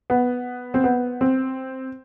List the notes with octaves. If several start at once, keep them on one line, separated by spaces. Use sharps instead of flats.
B3
C4
B3
C4